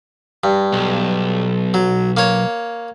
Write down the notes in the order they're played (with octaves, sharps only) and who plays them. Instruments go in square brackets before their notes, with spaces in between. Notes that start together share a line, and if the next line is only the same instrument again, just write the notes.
[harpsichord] G2
[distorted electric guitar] B1
[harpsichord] F#3
A#3 C#5